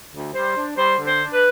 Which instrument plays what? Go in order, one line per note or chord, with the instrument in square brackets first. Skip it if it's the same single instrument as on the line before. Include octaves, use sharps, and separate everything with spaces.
[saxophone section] D2
G3 C5
D4
G3 C5
D3
C5
D4
B4